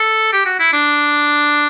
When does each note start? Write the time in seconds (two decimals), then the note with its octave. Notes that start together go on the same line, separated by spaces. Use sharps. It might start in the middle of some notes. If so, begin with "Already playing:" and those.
Already playing: A4
0.33 G4
0.46 F#4
0.60 E4
0.73 D4